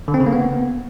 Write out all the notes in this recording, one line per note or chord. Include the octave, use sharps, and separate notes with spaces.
D3
C4
C#3
A#3
B3